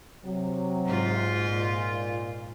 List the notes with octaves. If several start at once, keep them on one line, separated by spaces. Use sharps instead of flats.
C3 F#3
G#2 F4
A#2